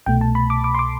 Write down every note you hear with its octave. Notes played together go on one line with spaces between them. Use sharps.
C2 B2 A3 G5
A5
B5
D6
D6
C6
D6